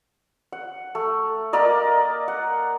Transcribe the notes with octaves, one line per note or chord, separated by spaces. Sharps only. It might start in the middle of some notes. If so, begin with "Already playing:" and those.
F#5
A3
A#3 A#4 D5 D#5
F#5